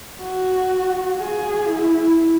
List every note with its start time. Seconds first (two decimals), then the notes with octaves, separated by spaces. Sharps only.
0.21 F#4
1.18 G#4
1.67 E4